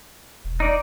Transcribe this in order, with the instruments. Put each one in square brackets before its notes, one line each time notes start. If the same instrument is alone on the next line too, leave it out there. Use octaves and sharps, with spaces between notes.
[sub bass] E1
[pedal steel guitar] D#4 D5